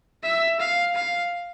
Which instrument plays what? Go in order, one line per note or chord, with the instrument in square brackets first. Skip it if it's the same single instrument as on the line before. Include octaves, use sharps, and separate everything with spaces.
[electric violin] E5
F5
F5